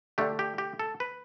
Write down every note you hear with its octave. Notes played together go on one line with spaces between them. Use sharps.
D3 A3 D4 G4
G4
G4
A4
B4